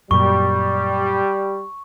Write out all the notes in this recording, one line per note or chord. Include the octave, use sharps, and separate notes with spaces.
F#2 A#2 G3 C#6